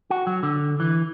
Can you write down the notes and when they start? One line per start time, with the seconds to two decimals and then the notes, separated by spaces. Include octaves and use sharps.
0.10 F#4
0.27 F#3
0.43 D3
0.80 E3